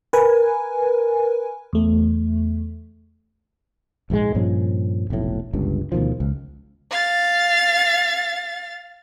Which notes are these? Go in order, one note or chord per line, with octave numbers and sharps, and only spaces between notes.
A#4 B4 G#5
E2 A3
A#1 G#2 E3 G#3
G2 A#2 F3 C#4
F1 B1 A2
G1 C#2 G2
D2 B2 D#3 F3
C#2
F5 A6